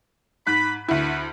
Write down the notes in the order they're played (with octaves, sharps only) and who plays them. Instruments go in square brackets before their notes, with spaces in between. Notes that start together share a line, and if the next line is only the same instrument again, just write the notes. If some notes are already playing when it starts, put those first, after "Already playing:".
[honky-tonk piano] G#2 F#6 B6 [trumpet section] B5
[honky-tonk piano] D2 E4 [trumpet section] F#4 B4